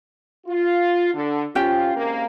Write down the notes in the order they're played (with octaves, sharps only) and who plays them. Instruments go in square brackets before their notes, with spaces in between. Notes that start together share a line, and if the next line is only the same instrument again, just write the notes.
[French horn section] F4
D3
[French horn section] F3 F4 [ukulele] C#4 G4 G5
[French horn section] G#2 C3 A#3